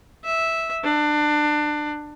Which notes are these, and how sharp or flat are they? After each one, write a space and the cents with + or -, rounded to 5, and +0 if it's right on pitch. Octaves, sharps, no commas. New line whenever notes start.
E5 -5
D4 +25